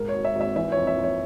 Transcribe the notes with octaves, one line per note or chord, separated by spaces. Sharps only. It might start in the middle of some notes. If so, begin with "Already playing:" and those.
Already playing: G#2 A#4
C#5
G#1
E5
G#1
E5
E3 E5
F2 C#5
E5
F2
C#5